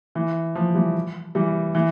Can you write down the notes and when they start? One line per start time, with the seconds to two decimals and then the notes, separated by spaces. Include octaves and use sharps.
0.15 E3
0.55 F3
0.75 E3 G3
1.35 E3 G3
1.75 E3